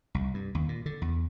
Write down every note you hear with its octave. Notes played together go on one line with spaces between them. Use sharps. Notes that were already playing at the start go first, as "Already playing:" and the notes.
C2
G2
D#2
A#2
D3
E2